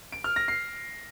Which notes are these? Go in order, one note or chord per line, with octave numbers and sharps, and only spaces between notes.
D7
F6
A#6
C7